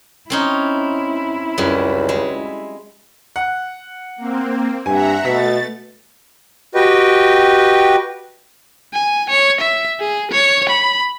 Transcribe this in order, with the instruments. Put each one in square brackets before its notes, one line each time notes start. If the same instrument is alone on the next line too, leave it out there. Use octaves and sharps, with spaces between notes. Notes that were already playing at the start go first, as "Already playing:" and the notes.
[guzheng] C4 C#4 D#4 [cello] E4
[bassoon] C#2 [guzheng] F#2 G3
[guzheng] G#3
[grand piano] F#5
[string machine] A#3 C4
[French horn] G2 [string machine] E5 F#5 A#5 [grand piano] G#5
[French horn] B2 [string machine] A3 A6 [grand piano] B6
[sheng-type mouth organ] F#4 G4 B4 D#5 G5
[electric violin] G#5
C#5
E5
G#4
C#5
B5